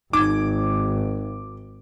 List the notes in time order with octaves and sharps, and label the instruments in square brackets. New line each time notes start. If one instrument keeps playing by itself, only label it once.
[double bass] G#1 [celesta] D#4 G#6 [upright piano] D6